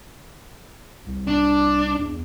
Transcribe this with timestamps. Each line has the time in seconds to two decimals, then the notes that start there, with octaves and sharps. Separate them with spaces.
1.06 C2
1.27 D4
1.98 E2